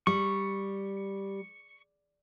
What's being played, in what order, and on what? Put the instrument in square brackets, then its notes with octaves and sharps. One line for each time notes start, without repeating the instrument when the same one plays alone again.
[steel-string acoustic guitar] G3 [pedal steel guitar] C#6